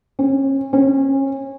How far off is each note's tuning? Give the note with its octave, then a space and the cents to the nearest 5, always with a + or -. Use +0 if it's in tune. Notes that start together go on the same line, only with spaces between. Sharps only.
C#4 -35
C#4 -30